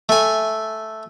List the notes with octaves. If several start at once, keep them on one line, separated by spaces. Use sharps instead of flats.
A3 G#5